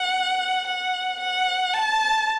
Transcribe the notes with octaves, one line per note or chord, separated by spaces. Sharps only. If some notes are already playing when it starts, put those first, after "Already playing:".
Already playing: F#5
F#5
F#5
A5